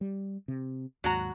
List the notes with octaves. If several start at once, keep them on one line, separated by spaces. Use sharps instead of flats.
G3
C3
D#2 G#2 F#3 F#4 A#5